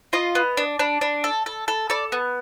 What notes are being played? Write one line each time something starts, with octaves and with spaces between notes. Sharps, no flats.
F4 D#5
B3
D4
D4
D4
A4
A4
A4
A4 D5
B3